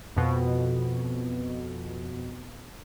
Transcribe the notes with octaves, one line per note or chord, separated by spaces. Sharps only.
F2 B2